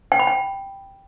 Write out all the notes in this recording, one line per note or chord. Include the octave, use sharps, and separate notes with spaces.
G5
B5
G5